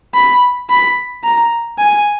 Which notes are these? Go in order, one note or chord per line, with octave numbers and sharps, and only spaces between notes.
B5
B5
A#5
G#5